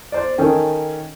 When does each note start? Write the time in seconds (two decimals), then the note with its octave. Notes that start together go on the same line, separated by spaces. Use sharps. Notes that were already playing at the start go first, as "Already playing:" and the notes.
0.12 C5 D5
0.38 D#3 C#4 A4 G5